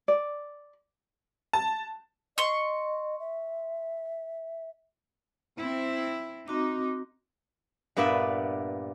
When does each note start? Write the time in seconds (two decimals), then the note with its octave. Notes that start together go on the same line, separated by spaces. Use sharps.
0.08 D5
1.53 A5
2.38 D#5 C6 C#6
3.20 E5
5.58 C4 E4
6.48 C4 D#4 F#4 D6
7.97 G2 A#2 B3 B4 D5 E5